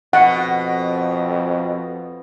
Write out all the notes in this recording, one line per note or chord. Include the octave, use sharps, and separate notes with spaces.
F2 B2 F#5